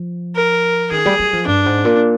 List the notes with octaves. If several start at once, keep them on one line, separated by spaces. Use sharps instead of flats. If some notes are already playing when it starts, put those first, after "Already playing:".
Already playing: F3
A#4
D#3 G#4
G3
G3
F3
G2 D4
G#2
A#2